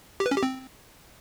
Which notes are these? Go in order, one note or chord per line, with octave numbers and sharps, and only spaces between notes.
G4
B4
C#4
G4
C4